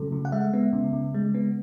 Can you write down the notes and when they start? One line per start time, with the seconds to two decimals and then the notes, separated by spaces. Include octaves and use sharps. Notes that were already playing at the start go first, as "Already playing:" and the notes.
Already playing: C#3 F#3 A3 A4
0.12 C#3
0.25 F#5
0.32 G#3 E5
0.53 B3
0.73 C#3
0.93 C#3
1.14 G#3
1.34 B3